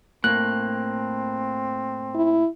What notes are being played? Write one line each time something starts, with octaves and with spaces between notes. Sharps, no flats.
A2 A#3 C4 F#6
E4